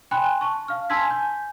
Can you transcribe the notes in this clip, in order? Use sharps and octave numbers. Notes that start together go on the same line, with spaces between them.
G5 G#5 B5 C6 F#6
A5 C#6
F5 F6
G#5 A5 C6 E6 G#6 B6
G#5 G6